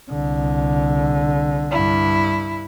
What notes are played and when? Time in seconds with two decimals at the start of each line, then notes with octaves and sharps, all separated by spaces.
0.10 C2 D3
1.71 G2 E4